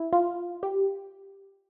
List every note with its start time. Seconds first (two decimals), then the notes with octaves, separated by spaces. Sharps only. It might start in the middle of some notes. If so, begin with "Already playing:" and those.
Already playing: E4
0.13 F4
0.63 G4